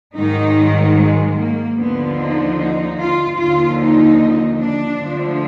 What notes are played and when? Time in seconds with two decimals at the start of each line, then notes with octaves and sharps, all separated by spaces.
0.16 G#2 D#3 F#3 D#4
0.97 G#3
1.36 A#3
1.78 D#2 D3 F3 B3
2.17 D#4
2.58 D#4
2.99 F4
3.39 D#2 D3 F3 F4
3.79 D#4
4.59 D4
5.00 D2 D3 F3